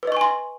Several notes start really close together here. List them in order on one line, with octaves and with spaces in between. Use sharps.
B4 D#5 C#6 G#5 C6